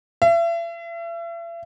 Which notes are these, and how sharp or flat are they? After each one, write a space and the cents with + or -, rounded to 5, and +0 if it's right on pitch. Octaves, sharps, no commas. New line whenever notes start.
E5 +40